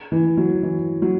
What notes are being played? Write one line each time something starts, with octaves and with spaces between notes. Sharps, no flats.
E3
F#3
E3
F#3